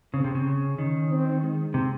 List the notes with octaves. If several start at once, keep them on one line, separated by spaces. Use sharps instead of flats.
C#3 C4
C3
C#3
C#4
D#3
C4
G#3
C3